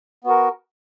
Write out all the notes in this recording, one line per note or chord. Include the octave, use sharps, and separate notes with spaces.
B3 F#4 A#4